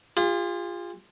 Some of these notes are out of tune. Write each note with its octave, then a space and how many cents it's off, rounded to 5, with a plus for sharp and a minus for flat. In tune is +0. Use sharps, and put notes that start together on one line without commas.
F4 +0 G#4 -45